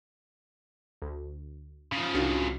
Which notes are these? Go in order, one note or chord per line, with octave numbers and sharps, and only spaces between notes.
D2
C#3 F3
C2 D4 F#4